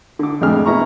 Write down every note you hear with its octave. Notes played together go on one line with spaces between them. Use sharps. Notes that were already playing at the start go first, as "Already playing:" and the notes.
D3 D6
F2 A2 G#3 D4 G#4 F6
B2 E4 A#5 C#6